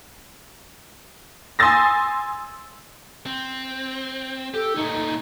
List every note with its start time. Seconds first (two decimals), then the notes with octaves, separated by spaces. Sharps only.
1.59 G#5 C6 D#6 E6 A6 A#6
3.26 C4
4.54 G4 A4
4.76 A#2 A3 D#4